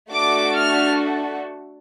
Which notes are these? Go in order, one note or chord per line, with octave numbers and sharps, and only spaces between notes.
A3 D4 F#4 A4 D6
F6